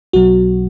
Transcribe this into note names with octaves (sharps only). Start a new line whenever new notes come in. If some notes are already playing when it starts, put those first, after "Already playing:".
B1 B2 F#3 F#4